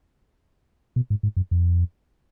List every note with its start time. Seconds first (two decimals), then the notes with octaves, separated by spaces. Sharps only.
0.96 B2
1.10 G#2
1.23 G#2
1.37 F#2
1.51 F2